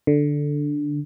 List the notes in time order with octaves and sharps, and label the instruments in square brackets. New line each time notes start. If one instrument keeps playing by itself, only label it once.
[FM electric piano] D3